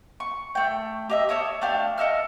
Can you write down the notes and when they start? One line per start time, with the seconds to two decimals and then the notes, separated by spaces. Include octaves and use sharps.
0.20 C#6
0.55 A3 G5
1.10 G4 D#5 E5
1.29 A4 C#5 E5 D#6
1.61 A3 D4 G4 F5
1.98 A4 D#5 E5 F6